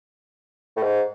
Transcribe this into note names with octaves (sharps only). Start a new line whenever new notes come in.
A2
G#2